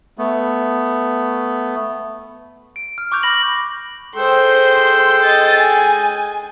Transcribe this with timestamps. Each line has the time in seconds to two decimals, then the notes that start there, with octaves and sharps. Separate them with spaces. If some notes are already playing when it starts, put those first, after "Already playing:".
0.18 A3 B3
2.76 D7
2.98 F6
3.12 C#6 D6 F#6 G6 F7
3.23 B5 A#6 F#7
4.15 G#3 A4 C5 G5 C6
5.23 D#5 A6
5.58 G#5